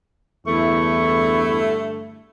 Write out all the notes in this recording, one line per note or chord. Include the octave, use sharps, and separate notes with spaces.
E2 G2 D3 A3 E4 C#6